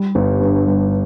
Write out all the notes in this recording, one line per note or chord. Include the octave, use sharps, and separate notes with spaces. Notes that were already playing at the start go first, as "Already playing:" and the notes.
Already playing: G3
G1
G2
G3